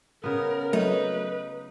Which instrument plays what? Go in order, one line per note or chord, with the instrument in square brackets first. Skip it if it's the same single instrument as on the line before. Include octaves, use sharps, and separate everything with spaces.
[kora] C#3 B3 [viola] A#4
[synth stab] F#3 A3 [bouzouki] D#4 [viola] B4